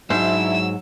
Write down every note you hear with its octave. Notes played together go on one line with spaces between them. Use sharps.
G#2 F#3 D4 E4 C5 E5 E6